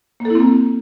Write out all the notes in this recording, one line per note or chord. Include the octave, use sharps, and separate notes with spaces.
A#3
A4
E4
C4
A#3